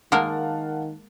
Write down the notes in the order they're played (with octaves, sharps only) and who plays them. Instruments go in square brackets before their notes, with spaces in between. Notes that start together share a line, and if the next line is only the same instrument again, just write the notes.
[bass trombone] D#3 [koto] G#3 A#3 A#4 [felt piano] F5 F#5 A5